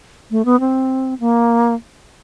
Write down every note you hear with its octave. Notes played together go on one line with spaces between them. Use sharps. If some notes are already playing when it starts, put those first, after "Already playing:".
A3
B3
C4
A#3